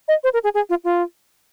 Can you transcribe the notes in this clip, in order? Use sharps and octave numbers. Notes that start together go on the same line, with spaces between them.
D#5
C5
A#4
G#4
G#4
F4
F4